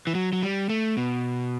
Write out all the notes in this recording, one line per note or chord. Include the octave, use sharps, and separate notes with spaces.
E3
F#3
F#3
G3
A3
B2